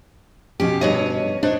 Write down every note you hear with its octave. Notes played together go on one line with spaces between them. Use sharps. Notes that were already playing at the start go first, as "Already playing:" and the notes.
B2 F3 C#4 G4
G2 C#5 D#5
D4 D#4 C5 C#5